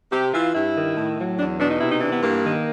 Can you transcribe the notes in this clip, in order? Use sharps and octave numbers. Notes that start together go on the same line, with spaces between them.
C3 G4
E3 F4
G2 E4
D#3
A2
F#3
E2 D4
B2 D4
D#4
C3 E4
D#4
E3 D4
B3
G2 A#3
D#3